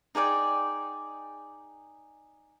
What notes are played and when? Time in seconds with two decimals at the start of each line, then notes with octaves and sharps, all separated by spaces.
0.15 D#4 G#4 D5 G5